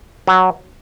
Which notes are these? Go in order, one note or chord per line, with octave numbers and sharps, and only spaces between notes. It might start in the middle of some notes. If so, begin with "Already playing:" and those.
F#3